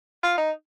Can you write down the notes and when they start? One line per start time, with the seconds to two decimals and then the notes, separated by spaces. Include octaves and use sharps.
0.23 F4
0.38 D#4